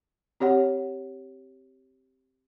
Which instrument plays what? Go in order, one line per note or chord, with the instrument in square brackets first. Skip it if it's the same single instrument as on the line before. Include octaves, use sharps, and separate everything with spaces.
[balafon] C4 G4 C#5 F#5